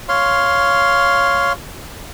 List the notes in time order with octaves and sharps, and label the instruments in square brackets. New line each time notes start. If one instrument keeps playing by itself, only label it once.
[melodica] C#5 F5 C6